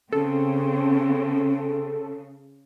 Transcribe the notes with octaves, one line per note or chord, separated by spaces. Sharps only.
C#3 C4 C#4 A4